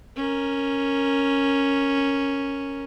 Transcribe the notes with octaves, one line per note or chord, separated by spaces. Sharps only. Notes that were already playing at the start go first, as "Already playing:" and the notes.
C#4 A#4